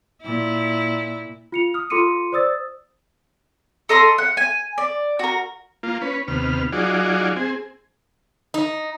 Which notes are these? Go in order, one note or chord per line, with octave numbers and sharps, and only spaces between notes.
A#2 E4
F4 C#7 F7
D#6 F6
F4 A4 C6 D6 C#7 D#7
C5 D5 D#6 E6 A6
A4 D#5 A#5 C6
F#5
G#5
D5
F#4 A#4
A#3 F4
C#4 B4
D#2 C3 B3 F6
F#3 D#4 F4 F#4 G#4 D5
C4 G#4
D#4